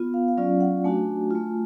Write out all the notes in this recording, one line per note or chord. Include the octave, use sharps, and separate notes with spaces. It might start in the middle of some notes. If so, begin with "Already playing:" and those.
Already playing: B3 F4
F5
F5
F#3 C#4 F4 D5
F#5
A3 D4 F#4 G#5
A3 F4